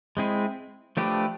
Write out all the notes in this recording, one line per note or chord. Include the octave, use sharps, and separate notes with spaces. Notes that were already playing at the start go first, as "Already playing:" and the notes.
G#3 C4 E4 G#4
F3 A3 D4 G4 B4